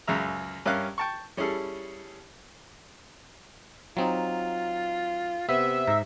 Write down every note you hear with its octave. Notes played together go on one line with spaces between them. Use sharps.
C#2 F#2 C#3 E5 A#5
G2 C#4 A#4 E5 F5 F#6
G5 A5 C#6
G3 C#4 E4 G#4 A4
F#3 C4 D#4 F4
C3 B3 E5
G#2 A#5